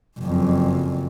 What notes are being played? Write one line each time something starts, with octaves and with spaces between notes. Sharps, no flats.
F#1 F2